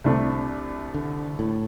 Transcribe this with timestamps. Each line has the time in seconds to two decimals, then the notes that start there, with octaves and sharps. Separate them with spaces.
0.04 C2 C3 A3 D4
0.94 D3
1.39 A2